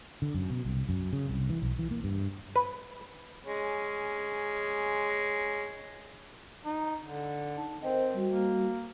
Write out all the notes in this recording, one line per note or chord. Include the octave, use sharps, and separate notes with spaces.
D3
F#2
B2
C2
F#2
C#3
C2
E3
B1
E3
A#3
G2
B4
G#3 C#4
D#4
D3
D#4 A5
C4 A#4 C5 D#5
G3 F#4
A#3